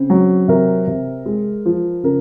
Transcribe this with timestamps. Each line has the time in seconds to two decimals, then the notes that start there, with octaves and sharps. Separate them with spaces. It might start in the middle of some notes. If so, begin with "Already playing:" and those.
Already playing: C#3 C4
0.10 F#3
0.48 C3 A#4
0.87 C3
1.26 G#3
1.65 F3
2.03 C#3 A#4